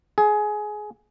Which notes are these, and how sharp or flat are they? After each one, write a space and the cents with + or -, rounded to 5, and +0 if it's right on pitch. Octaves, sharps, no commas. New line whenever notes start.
G#4 +20